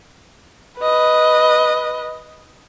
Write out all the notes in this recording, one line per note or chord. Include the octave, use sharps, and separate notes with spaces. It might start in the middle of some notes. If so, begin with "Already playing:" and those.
B4 D#5